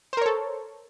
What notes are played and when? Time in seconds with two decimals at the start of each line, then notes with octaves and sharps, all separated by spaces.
0.13 C5
0.17 A#4
0.21 C#5
0.26 A4